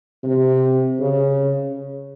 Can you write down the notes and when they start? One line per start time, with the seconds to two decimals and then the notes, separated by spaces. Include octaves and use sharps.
0.23 C3
1.00 C#3